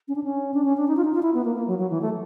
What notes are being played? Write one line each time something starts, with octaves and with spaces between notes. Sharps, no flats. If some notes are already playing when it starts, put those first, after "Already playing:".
C#4
D4
C#4
D4
C#4
D4
D#4
F4
D#4
F4
E4
B3
A#3
A#3
F#3
F#3
E3
A3